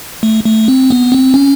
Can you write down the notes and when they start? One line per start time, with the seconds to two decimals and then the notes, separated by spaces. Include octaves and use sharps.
0.23 A3
0.45 A3
0.68 C4
0.90 B3
1.12 C4
1.34 C#4